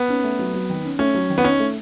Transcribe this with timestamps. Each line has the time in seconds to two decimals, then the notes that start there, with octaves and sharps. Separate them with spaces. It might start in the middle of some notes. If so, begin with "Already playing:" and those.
Already playing: B3
0.09 C#4
0.24 A3
0.39 F#3
0.54 F#3
0.70 D#3
0.84 C#4
0.99 A3 C#4
1.14 F#3
1.30 D#3
1.38 B3
1.44 C#4 D#4
1.60 A3